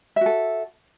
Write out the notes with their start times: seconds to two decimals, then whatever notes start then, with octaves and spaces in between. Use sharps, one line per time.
0.16 E5
0.21 F#4
0.26 A4